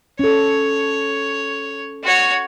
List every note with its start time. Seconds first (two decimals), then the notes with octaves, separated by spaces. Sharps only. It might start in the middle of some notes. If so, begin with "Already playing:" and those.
0.19 C#4 A4 C#5
2.04 F#4 C#5